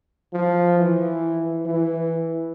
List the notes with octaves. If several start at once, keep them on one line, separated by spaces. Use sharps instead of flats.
F3
E3
E3